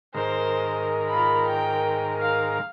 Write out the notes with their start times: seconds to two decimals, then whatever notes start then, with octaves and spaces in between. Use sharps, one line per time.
0.14 G#2 D#3 A#4 C5
1.07 F4 B5
1.46 G5
2.20 F5